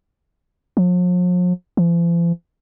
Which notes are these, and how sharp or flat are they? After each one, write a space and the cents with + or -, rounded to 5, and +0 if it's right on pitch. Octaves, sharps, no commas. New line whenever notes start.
F3 +45
F3 -45